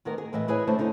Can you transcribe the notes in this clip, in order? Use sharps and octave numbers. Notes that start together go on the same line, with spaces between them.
D2 D#3 B3 A#4
G#4
A2 E3 D#5 E5
E4 G#4 B4 C#5 G#5
D3 A3 C5 A5
D3 D#4 E4 C5